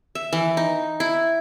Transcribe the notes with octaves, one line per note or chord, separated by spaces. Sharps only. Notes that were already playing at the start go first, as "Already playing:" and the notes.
E5
E3
D#4
E4